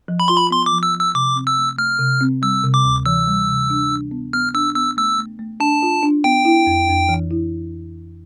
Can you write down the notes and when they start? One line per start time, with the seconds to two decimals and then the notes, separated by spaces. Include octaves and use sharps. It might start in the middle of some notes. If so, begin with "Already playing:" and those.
0.08 F3
0.20 B5
0.28 F4 C6
0.37 B5
0.51 B3 C6
0.66 D6
0.73 F3
0.83 E6
0.93 F3
0.99 E6
1.14 C3 D6
1.36 C4
1.47 E6
1.57 A3
1.78 A3 F6
1.99 C3
2.21 C4
2.42 G3 E6
2.64 C3
2.74 D6
2.84 D2
3.06 E3 E6
3.28 G3
3.48 C3
3.70 D4
3.91 D4
4.11 B3
4.33 B3 F6
4.54 D4 E6
4.75 B3 E6
4.97 A3 E6
5.18 A3
5.39 A3
5.60 D4 A5
5.82 F4
6.03 D4
6.24 B3 G5
6.45 E4
6.66 F2
6.89 F2
7.09 E3
7.31 E4